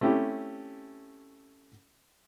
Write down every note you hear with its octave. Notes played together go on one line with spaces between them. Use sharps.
A3 C4 C#4 E4 G4